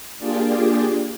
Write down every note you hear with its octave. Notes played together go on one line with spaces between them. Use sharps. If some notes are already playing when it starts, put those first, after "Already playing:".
A#3 D4 F4 G4 G#4 D5